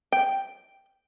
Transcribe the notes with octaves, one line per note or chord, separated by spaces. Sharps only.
G5